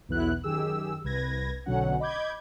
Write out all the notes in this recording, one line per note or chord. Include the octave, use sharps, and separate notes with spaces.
B1 E2 B3 E4 F#6
F#2 D#3 G4 G#4 E6
C2 B4 G#6 A#6
B1 B2 D3 F#3 C#4 F#5
D#5 B5 D6 G6 G#6